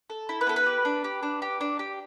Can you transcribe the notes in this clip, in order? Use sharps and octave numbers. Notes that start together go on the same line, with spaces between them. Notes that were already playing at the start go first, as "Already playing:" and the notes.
A4
E4
B4
B3 A4
B4
G4
D4
G4
D4
G4
D4
G4